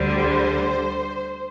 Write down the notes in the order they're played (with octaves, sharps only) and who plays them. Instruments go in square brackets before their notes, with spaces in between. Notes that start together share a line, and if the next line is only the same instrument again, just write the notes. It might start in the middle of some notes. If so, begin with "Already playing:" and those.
Already playing: [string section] D2 D3 G3 C5